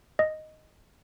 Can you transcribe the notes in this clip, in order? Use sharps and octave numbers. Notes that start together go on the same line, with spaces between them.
D#5